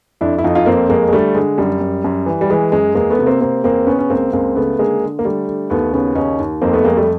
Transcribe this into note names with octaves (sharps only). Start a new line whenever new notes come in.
F2 D4 E4
E4
F2 D#4 F4
D#4 F4
F2 A#3 C4
F2 G#3 A#3
G#3
D3 G3 A3
D3 G#3
F#2 G3
F#2
F#2
E3
G3
E3 G#3
F#2 G#3
E2 G#3 A#3
A3 B3
C3
A#3 C4
C3 A#3 C4
E2 A#3 C4
C#3 B3 C#4
C#4
C#2 A#3 C4
C#2 A#3 C4
C#3 A3 B3
D3 G#3 A#3
D3
A#3
D3 G3 A3
D3
D#2 A3 B3
C#3 B3 C#4
D#2 C#4 D#4
D#2
F2 A#3 C4
A3 B3
F2 G#3 A#3
G3 A3